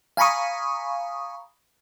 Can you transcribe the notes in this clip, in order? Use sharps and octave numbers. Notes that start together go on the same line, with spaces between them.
F5 G#5 A#5 B5 C#6 D#6